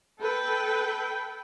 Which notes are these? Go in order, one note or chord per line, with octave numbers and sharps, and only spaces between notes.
A4 B4 G5